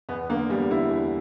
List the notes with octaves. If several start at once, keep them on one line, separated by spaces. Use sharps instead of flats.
E2 B3
D3 A#3
E2 G3
D3 E4
E2